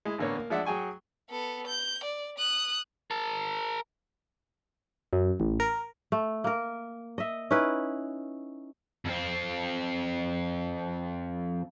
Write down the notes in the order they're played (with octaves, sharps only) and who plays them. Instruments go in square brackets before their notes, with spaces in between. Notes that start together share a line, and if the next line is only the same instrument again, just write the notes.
[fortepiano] G#3 E4
A1 D3 A#3 B3 C#5
A#3
F3 G#3 D4 D5 E5 F#5
F#3 G#4 G5 G#5 C#6
[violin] B3 A4
G6
D5
D#6 F#6
[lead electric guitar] A#4 A5
[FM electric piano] F#2
A1
A#4
[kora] A3
A#3 A#4
D#5 E5
C#4 D#4 E4 B4
[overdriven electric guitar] F2 C4